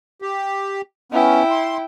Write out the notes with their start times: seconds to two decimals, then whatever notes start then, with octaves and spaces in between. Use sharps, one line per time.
0.22 G4
1.12 B3 C#4 E4 G5
1.51 C6